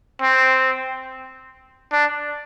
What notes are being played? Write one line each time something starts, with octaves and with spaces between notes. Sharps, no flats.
C4
D4